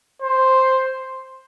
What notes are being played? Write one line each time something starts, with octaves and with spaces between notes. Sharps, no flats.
C5